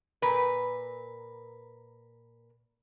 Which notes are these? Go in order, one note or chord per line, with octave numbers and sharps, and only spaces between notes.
A#2 A#4 B4